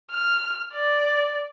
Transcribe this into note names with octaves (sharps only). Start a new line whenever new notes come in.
F6
D5